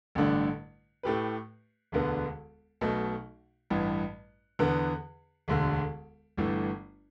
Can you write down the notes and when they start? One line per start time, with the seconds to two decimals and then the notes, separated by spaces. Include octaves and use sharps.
0.15 A1 G2 D3 A3 D4
1.03 A2 A3 G4 B4
1.92 E1 D2 D3 B3
2.81 B1 B2 A3
3.70 A1 G2 E3
4.59 E2 D3 B3
5.48 E1 D2 D3
6.37 G1 G2 E3 A3